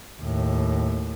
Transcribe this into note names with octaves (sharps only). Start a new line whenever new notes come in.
D#2 A2